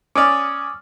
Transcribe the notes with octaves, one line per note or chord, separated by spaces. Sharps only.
C#4 D5 D6 D#6 F6